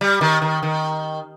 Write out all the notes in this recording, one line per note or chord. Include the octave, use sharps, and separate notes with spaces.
G3
D#3
D#3
D#3